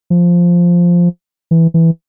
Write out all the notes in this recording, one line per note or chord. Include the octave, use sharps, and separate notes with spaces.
F3
E3
E3